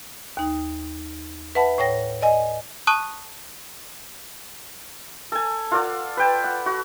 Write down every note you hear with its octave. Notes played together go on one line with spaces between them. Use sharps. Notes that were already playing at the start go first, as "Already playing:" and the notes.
D#2 D#4
B4 E5 F#5 A5 B5
A2 C#5 G5 A#6
D5 D#5 G#5
A5 C#6 D#6 F#6 D#7
A4 G#5
F4 A4 D5 F#5
B4 G5 A5
F#5
F#4